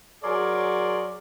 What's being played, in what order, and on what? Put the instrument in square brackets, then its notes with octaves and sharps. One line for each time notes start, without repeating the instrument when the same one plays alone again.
[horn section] F#3 G#4 D5 [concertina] A#4 C#5 C6